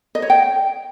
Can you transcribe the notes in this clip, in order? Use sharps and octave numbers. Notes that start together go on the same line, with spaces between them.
D#5
C#5
G5